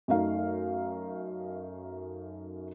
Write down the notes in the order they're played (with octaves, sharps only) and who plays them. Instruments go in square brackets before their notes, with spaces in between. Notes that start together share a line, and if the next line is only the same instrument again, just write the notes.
[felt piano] F#2 A3 D#4 F5